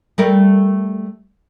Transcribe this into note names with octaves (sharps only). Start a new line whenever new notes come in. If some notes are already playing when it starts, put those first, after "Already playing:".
G3 A3 A#4